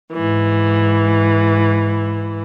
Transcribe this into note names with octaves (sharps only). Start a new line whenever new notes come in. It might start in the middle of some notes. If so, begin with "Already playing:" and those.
G#2 E3